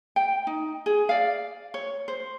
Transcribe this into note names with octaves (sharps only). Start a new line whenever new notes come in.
G5
D#4
G#4
D5 F5
C#5
C5